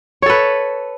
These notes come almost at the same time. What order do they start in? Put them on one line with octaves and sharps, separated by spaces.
C#5 A4 B4